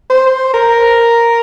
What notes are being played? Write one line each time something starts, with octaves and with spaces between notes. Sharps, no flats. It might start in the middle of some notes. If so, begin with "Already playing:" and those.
C5
A#4